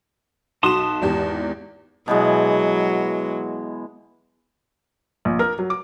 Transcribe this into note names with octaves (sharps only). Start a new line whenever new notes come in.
B1 F#4 A5 C6 D#6 E7
G#1 E2 G4
B2 E3 F#3 G#3
A#1
A#4
F#3
D6